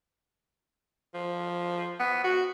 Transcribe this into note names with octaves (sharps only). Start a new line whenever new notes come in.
F3
B3
F#4